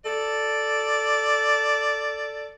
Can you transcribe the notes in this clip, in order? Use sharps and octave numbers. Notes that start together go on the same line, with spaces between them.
A4 D5